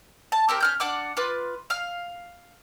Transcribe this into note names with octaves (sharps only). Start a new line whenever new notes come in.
A5
C4 G4 A#4
C#4 F6 G6
D4 F#5 D6 F6
F4 B4 D6
F5 F6